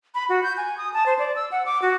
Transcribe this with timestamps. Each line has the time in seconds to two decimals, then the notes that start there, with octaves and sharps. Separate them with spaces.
0.15 B5
0.29 F#4
0.43 G6
0.57 G#5
0.78 D#6
0.94 A5
1.06 C5
1.19 D5
1.36 E6
1.52 F#5
1.66 D6
1.82 F#4